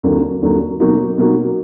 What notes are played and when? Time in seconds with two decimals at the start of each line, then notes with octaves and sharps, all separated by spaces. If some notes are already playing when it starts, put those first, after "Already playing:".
0.03 D#2 D3 F#3 A#3
0.42 D#2 D3 F#3 A#3
0.80 B2 F#3 A#3 D#4 F#4
1.18 B2 F#3 A#3 D#4 F#4